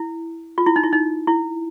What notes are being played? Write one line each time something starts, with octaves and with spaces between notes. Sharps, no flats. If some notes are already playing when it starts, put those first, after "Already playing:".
Already playing: E4
F4
E4
D#4
E4
D#4
E4